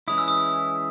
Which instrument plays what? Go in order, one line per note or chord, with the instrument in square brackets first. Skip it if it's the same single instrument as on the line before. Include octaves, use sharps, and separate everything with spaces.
[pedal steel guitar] E3 G#3 C#4 E4 [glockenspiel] D#6
[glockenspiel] E6
D#6